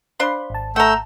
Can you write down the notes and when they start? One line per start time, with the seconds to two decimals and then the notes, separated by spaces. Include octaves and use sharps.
0.20 D4 C5 F5 B5 C6
0.50 G#1 A5
0.76 A3 F#5 A#5 E6 G6